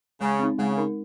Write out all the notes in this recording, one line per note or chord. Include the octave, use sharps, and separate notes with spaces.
C#3 G#3
C4 D#4
C#3 G#3
D#4 A#4